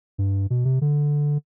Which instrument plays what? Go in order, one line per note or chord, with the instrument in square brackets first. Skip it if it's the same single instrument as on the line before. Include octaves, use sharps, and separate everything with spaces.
[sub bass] G2
B2
C3
D3